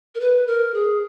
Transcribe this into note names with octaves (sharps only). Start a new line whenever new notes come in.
A#4
B4
A#4
G#4